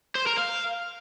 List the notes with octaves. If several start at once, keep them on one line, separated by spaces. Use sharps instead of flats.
C5
A#4
F5